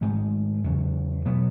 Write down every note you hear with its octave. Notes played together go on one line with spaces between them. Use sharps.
G#2 D#3 A3
E2 C#3 F#3
B2 F#3 B3